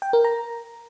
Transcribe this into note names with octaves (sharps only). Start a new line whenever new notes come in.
G5
A#4
A#5